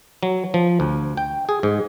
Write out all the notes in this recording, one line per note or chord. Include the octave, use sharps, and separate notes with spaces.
F#3
F3
D2
G5
G#4
G#2